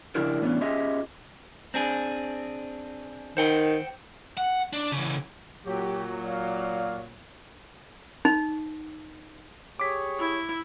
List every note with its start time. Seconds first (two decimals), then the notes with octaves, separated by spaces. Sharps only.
0.15 C#3 F3 D4 E4 G4 A#4
0.41 A2 E3 B3 C#4 D4
0.61 C#4 F4 G4 G#4 D#5 E5
1.74 C4 D4 G#4
3.37 D#3 C5 F#5 G5
4.37 F#5
4.73 D4
4.92 C#3 E3
5.66 A#2 F#3 G4
6.25 D5 F5
8.25 D#4
9.79 G4 G#4 C#5 D6 B6
10.20 E4